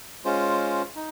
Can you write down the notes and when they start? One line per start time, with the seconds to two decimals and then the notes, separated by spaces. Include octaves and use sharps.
0.25 G#3 C#4 F4 C5
0.96 D#4